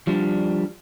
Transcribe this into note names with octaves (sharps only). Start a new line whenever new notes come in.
F3 G3 D4